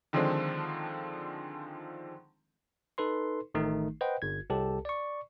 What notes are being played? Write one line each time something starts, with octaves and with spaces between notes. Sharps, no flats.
D3 D#3 F3 G#3 C4 D4
D#4 A4 B4 C6
A1 D#3 A3 D#4
B4 C5 D#5 F#5 G5
G1 G#6
C2 G4 A4 A5
D5 C#6